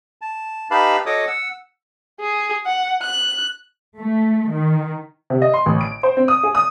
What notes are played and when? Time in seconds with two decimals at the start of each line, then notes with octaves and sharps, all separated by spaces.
0.21 A5
0.71 D#4 G4 B4 F5 A5 B5
1.06 F#4 A4 C#5 D#5 D6 D#6
1.27 F#5 E6
2.21 G#4
2.66 F#5
3.02 F#6
3.98 A3
4.50 D#3
5.30 C3
5.42 D#5
5.54 C6
5.66 A1
5.81 D7
6.03 C5
6.17 C4
6.28 D#6
6.43 G#4
6.55 D#6